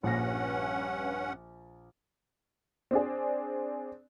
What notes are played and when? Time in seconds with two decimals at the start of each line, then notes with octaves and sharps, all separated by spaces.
0.03 A#1 G2 C#4 F#5 A#6
2.91 C4 D4 G#4